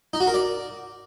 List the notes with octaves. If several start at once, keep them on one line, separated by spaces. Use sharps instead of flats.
D#4
F#4
A#4
D5